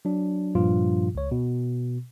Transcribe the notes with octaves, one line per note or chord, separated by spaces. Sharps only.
F#3 D4
G2 A#2 F3 F4
C#2 C#5
B2